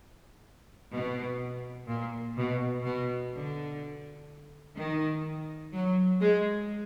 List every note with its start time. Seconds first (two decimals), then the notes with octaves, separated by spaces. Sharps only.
0.92 B2
1.88 A#2
2.37 B2
2.85 B2
3.33 D3
4.77 D#3
5.73 F#3
6.21 G#3